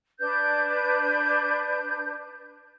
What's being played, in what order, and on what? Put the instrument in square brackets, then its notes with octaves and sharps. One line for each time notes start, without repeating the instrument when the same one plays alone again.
[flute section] D4 B4 G6